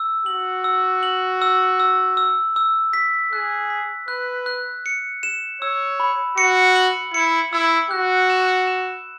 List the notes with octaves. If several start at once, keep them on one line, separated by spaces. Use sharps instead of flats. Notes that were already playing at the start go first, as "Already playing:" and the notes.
Already playing: E6
F#4 F#7
E6
F#7
E6
E6
E6
E6
B6
G#4 F#6
B6
B4 F#6
F#6
C#7
E7
C#5 E6
B5
F#4 C#7
F#7
E4 C#7
E4 E6
F#4 F#6
E7
E7